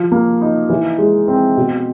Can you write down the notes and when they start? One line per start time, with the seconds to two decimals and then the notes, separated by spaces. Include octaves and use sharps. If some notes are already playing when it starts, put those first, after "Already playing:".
Already playing: F3
0.12 A#3
0.41 D#4
0.70 E3
0.99 G#3
1.28 C4
1.57 B2